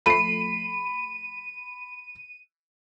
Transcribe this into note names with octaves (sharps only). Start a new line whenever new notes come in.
F3 A3 B5 C7 D#7